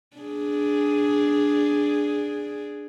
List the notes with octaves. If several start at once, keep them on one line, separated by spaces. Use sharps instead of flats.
D4 G#4